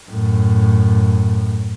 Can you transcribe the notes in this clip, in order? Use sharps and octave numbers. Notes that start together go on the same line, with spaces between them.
F#2 A2